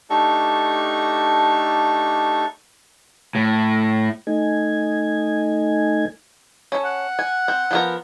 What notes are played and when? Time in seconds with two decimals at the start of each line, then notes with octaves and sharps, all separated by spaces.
0.10 A3 D4 D#4 G4 A4 C#6
3.35 A2
4.27 A3 D#4 G#5
6.72 C#4 A4
6.85 F#5
7.19 G#5
7.48 C4
7.71 F3 B3 A#4